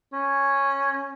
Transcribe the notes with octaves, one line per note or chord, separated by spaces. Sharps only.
C#4